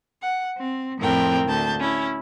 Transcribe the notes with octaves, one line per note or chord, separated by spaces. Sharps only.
F#5
C4
F2 A2 C4 E4 A#4 G5
D2 A5 G6
C#4 E4